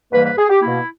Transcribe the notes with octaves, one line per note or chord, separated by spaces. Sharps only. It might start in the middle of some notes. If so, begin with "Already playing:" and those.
G#2 E3 G3 A#3 B4
B4
G#4
G4
B2 A#3 E4